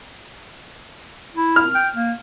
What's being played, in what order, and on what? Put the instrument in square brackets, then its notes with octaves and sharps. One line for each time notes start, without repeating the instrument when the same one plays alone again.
[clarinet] E4
[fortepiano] F6
[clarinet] G5
A#3